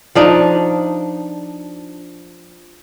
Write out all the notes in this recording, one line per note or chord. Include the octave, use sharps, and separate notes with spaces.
F3 D4 D#4